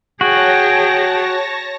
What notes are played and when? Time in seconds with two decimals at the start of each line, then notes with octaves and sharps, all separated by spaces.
0.21 F#4 G#4 C#5 G5 A5 A#6